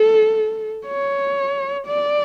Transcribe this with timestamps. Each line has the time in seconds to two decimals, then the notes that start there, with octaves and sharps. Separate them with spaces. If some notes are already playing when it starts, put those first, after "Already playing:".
Already playing: A4
0.86 C#5
1.87 D5